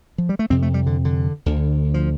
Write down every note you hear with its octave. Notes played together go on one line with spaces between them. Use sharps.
F3
G3
A3
F2 C3 C4
A3
G3
D3
D3
D2 D3
F3